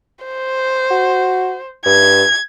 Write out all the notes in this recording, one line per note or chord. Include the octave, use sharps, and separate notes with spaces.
C5
F#4
G2 G#6